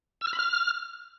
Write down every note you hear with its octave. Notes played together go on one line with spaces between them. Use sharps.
E6
F6
B5
F6